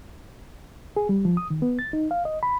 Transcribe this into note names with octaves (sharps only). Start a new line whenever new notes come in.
G#4
G3
F3
D#6
D#3
B3
A6
D#4
F5
D#5
B5